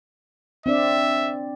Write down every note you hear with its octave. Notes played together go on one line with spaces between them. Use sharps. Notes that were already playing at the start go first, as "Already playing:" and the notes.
C4 D4 D5 E5